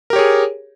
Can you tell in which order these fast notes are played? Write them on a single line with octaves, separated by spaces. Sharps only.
A#4 G4 C#5 G#4